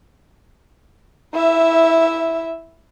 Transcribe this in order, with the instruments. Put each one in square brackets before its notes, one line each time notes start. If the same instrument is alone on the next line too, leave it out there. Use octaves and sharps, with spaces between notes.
[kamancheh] E4 E5